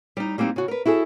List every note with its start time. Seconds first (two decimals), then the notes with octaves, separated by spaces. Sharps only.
0.17 G3 D#4
0.38 G3 A#3 C4 D4 D#4
0.56 C#3 F#4
0.68 A#4 B4
0.86 E4 F#4 G#4 A4